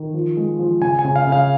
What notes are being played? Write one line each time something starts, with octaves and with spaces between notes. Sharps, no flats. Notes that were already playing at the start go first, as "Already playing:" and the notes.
Already playing: D#3
F3
G#3
F3
C#3 G#5
G#5
C#3
F5
C#3
F5